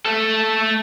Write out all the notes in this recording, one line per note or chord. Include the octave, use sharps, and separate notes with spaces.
A3 A4